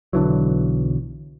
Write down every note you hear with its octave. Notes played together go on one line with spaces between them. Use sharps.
B1 D3 E3 F#3